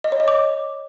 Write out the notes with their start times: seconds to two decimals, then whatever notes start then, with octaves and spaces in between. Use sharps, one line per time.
0.04 D#5
0.12 C#5
0.20 D#5
0.28 D6